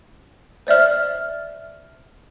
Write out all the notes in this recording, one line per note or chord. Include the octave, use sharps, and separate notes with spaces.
C5 D5 E5 F6